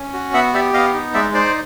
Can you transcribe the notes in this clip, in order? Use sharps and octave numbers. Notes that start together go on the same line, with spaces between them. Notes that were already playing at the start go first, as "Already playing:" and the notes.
Already playing: C#4
F#4
B3 E5 F#5
G4 D5 E5
B3 D#5 F5
D#4
G#3 D5 E5
D#4 C5 D5